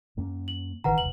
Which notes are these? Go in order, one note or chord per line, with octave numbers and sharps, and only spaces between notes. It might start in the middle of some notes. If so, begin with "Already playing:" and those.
F#2 A#3 C#4
F#7
G#1 D#3 E3 B4 F#5 A#5
E1 C2 F#7